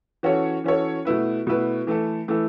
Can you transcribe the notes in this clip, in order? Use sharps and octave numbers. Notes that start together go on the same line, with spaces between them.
E3 C#4 F#4 A4 C#5
E3 C#4 F#4 A4 C#5
B2 A3 E4 B4
B2 A3 E4 B4
E3 A3 E4 A4
E3 A3 E4 A4